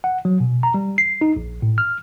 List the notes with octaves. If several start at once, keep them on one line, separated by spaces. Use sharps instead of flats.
F#5
F#3
B2
A#5
G3
C7
D#4
A#1
A2
F6